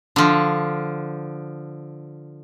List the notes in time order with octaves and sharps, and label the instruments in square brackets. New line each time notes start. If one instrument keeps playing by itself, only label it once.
[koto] D3 F3